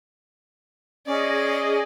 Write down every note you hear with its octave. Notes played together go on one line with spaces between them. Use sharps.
C#4 G#4 D5 D#5